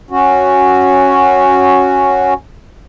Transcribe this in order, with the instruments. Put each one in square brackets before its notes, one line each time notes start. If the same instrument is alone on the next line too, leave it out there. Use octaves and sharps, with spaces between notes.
[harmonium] C#4 F#4